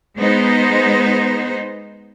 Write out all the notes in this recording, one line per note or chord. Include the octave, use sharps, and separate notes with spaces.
G#3 B3 D#4 C5